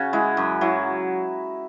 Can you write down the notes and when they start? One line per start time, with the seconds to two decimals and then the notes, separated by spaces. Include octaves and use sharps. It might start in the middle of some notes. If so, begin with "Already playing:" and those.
Already playing: C#3 F#4
0.13 G#3 E4
0.37 F#2
0.61 F#3 E4